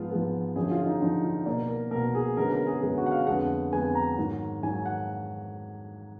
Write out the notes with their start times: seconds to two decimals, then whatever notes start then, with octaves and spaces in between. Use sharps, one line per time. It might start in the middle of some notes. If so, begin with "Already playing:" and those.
Already playing: G#2 F3 G#3 B3 F4
0.11 G#2 F3 G#3 B3
0.56 F#2 D3 F3 G#4
0.71 F4
0.82 F4
0.86 D#4
1.01 F#2 D3 F3 D#4
1.23 F4
1.46 B2 A#3 D5
1.69 A#4
1.91 B2 A#3 A#4
2.15 G#4
2.37 F#2 D3 G#3 B3 A#4
2.52 A#4
2.67 G#4
2.82 F#2 D3 G#3 B3 G#4
2.98 F#4
3.06 F#5
3.12 F5
3.27 F2 D3 G#3 B3 F#5
3.72 F2 D3 G#3 B3 G#5
3.95 A#5
4.17 G#2 D#3 F#3
4.63 G#2 D#3 F#3 G#5
4.86 F#5